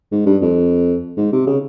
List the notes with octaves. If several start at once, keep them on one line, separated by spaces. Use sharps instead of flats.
G#2
G2
F2
G#2
C3
C#3